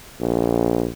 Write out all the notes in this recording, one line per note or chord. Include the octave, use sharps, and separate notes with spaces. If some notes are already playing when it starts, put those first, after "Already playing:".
A#1